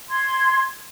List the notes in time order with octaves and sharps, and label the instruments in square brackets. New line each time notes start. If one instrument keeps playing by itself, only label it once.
[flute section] C6 G#6